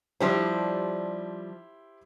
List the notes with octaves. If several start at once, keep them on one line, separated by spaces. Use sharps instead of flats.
F3 G3 D4 E4 G4 C5